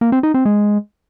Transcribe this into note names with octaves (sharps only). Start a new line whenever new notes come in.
A#3
C4
D#4
C4
G#3